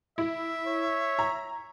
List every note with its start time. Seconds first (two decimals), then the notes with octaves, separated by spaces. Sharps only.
0.18 E4 E5
0.67 C#5
1.19 A#5